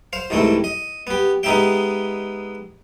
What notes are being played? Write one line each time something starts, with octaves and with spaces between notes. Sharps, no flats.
C5 F5
C2 G#2 E3 A3 C4
D#5
B3 G4
G#3 B3 D#4 G4 E5 G5